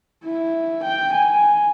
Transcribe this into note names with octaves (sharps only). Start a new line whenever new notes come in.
E4
G5
G#5